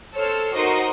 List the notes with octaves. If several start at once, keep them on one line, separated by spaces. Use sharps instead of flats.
A4 C5 C#5 E6 F6
D#4 F#4 A#4 C5 C6 D#6